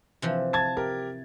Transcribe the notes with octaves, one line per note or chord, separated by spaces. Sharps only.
C3 E3 F3
A5 G#6 A6
G4 A#4